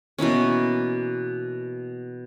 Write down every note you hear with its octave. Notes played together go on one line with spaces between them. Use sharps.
B2 E3 A#3 C#4